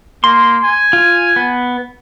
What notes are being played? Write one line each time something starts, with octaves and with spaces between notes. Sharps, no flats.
A#3 C6
G#5
F4
B3